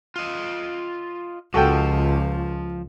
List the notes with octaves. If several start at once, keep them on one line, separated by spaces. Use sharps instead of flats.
F4 D#5
C#2 F3 F#4 A4 G5